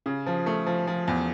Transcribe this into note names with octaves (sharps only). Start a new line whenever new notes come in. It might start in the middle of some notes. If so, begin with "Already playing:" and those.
C#3
F3
A3
F3
F3
E2